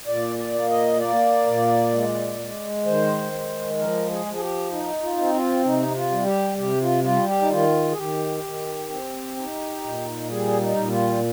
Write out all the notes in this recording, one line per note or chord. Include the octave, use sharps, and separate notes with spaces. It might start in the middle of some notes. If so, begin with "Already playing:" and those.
A#2 D5
D5
A#3
D#5
A#3 D5
A#2
G#3
G#3
D#3 C5
G#3
F3 A#4
G#4
F3
G#4
G4
D#4
F4
C4
F4
C3 D#4
F4
G3
G4
C3 G4
F4
G3 F4
G4
D#4
D#3 F4
G#4
D#3 G4
D#3
C4
D#4
A#2
G3 G#4
D#4
A#2
F4